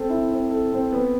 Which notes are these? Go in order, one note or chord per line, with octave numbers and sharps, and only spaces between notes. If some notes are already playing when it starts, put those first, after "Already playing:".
Already playing: C4 A4
E4
C4
A4
C4
B3